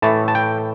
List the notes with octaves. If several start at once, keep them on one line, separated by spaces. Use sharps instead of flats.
A2 E3 A3 A5
A5
G5